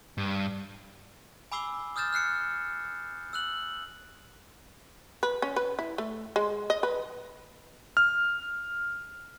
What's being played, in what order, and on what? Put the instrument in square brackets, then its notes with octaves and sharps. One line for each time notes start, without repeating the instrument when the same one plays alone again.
[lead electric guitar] G2
[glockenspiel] G#5 B5 D6 E6 C7 G7
D#6 F6 G6 A6 E7
F6 F#6 C7 C#7
E6 F#6 F#7
[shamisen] B4
C#4
B4
E4
A3
G#3
D#5
B4
[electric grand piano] F6